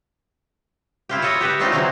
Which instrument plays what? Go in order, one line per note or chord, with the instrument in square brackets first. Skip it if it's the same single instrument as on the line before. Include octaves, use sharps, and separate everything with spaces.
[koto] E4 F4 G4
A4 C#5 D#5 E5
G4 B4
F#3 A3 C4 D4 D#4 F4
C3 E3 F#3 G#3